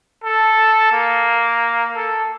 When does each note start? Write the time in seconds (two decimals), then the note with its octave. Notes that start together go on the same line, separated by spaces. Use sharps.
0.24 A4
0.92 A#3
1.96 A4